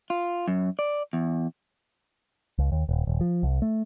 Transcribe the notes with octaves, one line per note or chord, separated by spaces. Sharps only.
F4
F#2
D5
E2
C#2
D#2
D#1
D#1
F3
C2
A3